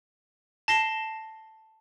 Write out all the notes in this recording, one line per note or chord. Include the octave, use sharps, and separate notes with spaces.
A5 A#6 C7 G7